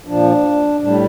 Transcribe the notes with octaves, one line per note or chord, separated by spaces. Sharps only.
A#2 F3 D4
A2 G3 D4